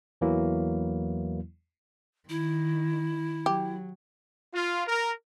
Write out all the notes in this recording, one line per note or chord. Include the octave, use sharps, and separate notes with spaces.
E2 E3 F#3 A#3 E4
D#3 E4
F#3 G4
F4
A#4